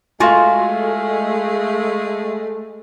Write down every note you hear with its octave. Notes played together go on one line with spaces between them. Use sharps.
G#3 A3 F4 F#4 F5 G#5